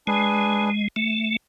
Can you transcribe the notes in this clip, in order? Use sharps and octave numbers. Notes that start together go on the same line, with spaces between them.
G#3 D4 G#4 B4
A3